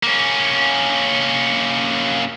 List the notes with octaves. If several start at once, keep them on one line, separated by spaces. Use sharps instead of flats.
A#3 C#4